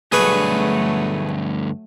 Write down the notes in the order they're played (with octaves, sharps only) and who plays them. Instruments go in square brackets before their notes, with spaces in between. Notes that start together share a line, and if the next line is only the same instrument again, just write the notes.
[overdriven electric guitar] D2 G2 [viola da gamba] F#3 A3 [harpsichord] G#4 B4 C#6